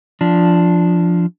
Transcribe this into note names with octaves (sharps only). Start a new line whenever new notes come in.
F3 D4